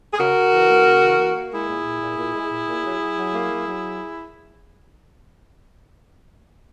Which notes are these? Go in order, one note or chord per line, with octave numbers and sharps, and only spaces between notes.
G#4
C#3 F#4 A#4
C#3
E3
A#3
C#3
E3
A#3
A#3
G#3 E4 G#4
A#2
A#2
A#2
A#2
G#3
A#2
A#2
F#3
F#3
F#3
A#3
F#3
F#3